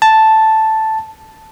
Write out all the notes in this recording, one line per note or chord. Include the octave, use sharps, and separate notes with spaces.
A5